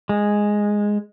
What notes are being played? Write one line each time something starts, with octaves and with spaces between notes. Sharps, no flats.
G#3